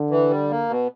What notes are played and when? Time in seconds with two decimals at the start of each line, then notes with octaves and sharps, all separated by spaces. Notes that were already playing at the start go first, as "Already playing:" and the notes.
Already playing: D3
0.10 E3
0.30 G3
0.50 A#3
0.69 B2